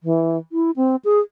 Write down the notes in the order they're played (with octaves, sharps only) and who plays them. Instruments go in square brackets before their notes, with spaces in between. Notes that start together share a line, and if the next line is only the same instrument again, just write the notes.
[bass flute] E3
E4
C4
G#4